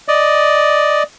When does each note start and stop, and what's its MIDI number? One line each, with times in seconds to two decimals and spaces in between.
0.08 1.03 74
0.08 1.03 75